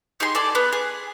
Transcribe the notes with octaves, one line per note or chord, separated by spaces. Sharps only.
D#4 G4 G#4 C6
A4 D5 G#5
B3
G#4